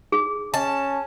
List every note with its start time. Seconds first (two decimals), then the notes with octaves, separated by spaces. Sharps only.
0.12 G#4
0.54 C#4 A5